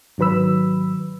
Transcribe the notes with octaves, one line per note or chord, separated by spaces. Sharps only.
G#2 D#3 F#3 B4 B5 E6